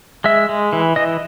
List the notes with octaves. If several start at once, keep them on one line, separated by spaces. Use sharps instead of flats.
G#3 E5
G#3
E3
E3 D#5